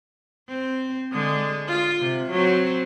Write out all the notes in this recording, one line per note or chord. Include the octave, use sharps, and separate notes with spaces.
C4
D3 G#3 G#4
F4
C3
F#3 C4